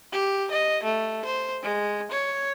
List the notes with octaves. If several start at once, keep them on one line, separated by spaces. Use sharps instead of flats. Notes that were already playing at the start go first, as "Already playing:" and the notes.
G4
D#5
A3
C5
G#3
C#5